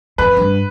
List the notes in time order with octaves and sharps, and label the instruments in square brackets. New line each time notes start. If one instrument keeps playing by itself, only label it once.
[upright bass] F2 [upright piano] B4
[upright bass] G2